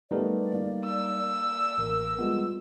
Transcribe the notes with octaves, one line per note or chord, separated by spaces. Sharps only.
G3 A3 B3 D#4 G4 A#4 D5
A#3
E6
D5
A1 A#4
G3 G#3 B3 F4